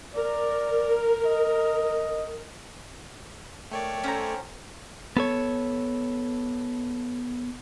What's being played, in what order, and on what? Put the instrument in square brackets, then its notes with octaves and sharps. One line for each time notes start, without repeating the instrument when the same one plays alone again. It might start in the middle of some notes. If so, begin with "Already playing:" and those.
[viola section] A#4 [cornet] D5
[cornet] D#5
[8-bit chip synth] A3 C#5 D5 [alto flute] A#4 [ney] G5
[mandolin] C#4 C5 A#5 [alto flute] A4
[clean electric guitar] B3 A4 C#5